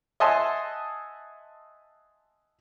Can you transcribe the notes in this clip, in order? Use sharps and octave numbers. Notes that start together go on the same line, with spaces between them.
D#5 E5 F#5 G#5 A5 C6